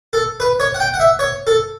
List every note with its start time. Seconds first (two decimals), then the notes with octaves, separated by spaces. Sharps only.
0.13 A4
0.40 B4
0.60 C#5
0.74 F#5
0.80 G5
0.94 F#5
1.00 E5
1.19 C#5
1.47 A4